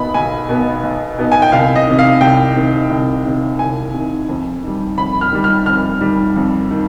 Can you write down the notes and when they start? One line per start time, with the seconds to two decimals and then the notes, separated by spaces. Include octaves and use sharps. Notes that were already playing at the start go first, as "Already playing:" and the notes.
Already playing: B1 B2 B3 D#4 B5
0.14 B1 G#5
0.49 B2 B3 D#4
0.83 B1
1.18 B2 B3 D#4
1.32 G#5
1.42 G5
1.52 C2 F5
1.76 D#5
1.87 C3 D#3
1.99 F5
2.21 C2 G5
2.56 C3 D#3
2.90 C2
3.25 C3 D#3
3.59 C2 G#5
3.94 C3 D#3
4.29 F2
4.63 D#3 G3
4.98 F2 B5
5.21 F6
5.33 D#3 G3
5.44 F6
5.66 F2 F6
6.01 D#3 G3
6.36 F2
6.71 D#3